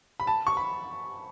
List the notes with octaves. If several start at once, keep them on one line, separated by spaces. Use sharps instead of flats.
B5
A5
C#6
B5